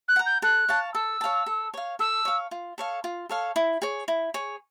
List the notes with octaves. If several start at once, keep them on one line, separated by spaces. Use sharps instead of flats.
F#6
F#5 A#5
G6
A4 F#6
C#5 F5 A5
A4 E6
C#5 F5 A5
A4
C#5 F5
A4 E6
C#5 F5
F4
A4 C#5 F5
F4
A4 C#5 F5
E4
G#4 C#5
E4
G#4 C#5